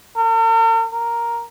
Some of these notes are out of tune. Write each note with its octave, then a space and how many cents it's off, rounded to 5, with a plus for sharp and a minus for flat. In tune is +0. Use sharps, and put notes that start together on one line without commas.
A#4 -45
A#4 +5